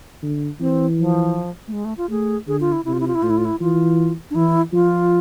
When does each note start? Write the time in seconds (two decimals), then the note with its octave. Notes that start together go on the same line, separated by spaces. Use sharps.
0.23 D3
0.60 E3 C4
0.98 F3
1.68 A3
1.73 G#3
1.85 A3
1.97 F4
2.10 A3 G#4
2.48 D3 G#4
2.60 F4
2.72 E4
2.85 C3 E4
2.93 F4
3.00 E4
3.07 F4
3.15 E4
3.23 A2 F4
3.30 E4
3.38 F4
3.45 E4
3.60 E3 F4
4.31 D4
4.35 E3 E4
4.73 F3 F4